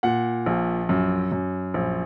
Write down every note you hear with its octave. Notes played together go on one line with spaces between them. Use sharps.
A#2 F#5
A#1
F#2
F#2
A#1